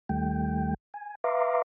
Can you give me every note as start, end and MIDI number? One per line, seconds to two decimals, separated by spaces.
0.09 0.74 39
0.09 0.74 51
0.09 0.74 55
0.09 0.74 57
0.09 0.74 79
0.94 1.15 80
1.24 1.62 71
1.24 1.62 76
1.24 1.62 77
1.24 1.62 82
1.24 1.62 84
1.24 1.62 86